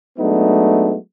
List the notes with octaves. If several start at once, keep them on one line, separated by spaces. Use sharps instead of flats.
F#3 G#3 A3 B3 D4 D#4